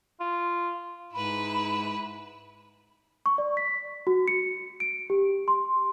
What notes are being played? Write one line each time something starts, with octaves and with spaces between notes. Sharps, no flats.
F4
G#2 E4 B4 B5
C#6
D5
B6
F#4
C#7
D7
G4
C6